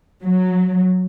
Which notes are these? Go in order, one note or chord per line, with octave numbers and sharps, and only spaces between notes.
F#3